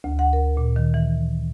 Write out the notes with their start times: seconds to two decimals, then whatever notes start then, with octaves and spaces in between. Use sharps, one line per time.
0.04 D2
0.19 F#5
0.33 A#4
0.57 A#2
0.76 D#3
0.94 E3